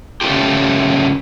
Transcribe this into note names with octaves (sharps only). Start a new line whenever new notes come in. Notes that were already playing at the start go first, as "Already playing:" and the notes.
C#3 G3 A3 F4 G4